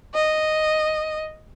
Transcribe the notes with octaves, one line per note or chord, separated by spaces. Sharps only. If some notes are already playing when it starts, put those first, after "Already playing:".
D#5